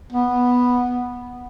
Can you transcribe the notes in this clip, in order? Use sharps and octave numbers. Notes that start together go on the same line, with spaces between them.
B3